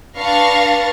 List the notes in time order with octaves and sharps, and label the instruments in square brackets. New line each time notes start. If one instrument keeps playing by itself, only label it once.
[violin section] D4 B4 F5 C#6 A6 A#6